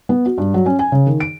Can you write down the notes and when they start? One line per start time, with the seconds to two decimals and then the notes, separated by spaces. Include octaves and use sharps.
0.09 B3
0.26 F#4
0.38 G2
0.54 F#3
0.66 C#4
0.79 G#5
0.92 C#3
1.07 D#3
1.20 D7